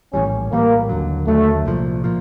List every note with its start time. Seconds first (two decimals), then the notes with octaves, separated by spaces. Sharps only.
0.13 A#1 A2 E3 G3 C#4
0.52 A#1 A2 E3 G3 A#3
0.89 D#2 D3 F#3
1.27 D#2 D3 F#3 A3
1.66 C2 A#2 F3
2.04 A#2 F3